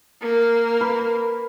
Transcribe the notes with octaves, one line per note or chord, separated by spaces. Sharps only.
A#3 A#4
B4